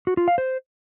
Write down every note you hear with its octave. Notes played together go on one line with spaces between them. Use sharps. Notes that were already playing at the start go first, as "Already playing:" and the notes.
F#4
F4
F5
C5